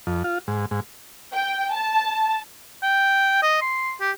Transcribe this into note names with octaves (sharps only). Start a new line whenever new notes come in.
F2
F4
G#2
G#2
G5
A5
G5
D#5
C6
G4